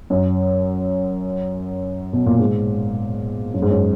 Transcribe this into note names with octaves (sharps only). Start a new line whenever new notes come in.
F#2
B2
A#2
G#2
F#2
G#2
F#2